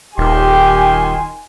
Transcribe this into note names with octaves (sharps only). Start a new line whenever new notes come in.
D#1 D#3 G4 G#5 C6